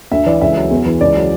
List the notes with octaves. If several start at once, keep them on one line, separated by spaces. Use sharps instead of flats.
D2 E5
E3 D5
C#2 E5
F#3
E2
E3
C#2 D5
F#3